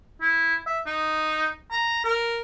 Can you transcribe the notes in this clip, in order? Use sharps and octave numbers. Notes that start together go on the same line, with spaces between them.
E4
E5
D#4
A#5
A#4